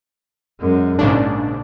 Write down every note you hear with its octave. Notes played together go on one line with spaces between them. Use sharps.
F#2 G#3
A#1 G#2 C#3 D4